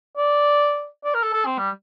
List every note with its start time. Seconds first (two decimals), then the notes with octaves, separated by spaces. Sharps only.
0.17 D5
1.04 D5
1.14 A#4
1.23 A4
1.33 A4
1.46 C4
1.58 G3